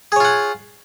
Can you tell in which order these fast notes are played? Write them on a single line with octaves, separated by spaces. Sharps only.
G#4 C#5 F4 F#5